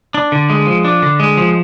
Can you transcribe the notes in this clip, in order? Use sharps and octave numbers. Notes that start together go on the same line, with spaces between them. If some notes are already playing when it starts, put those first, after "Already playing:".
D4
D3
G#3
F3
D4
D3
G#3
F3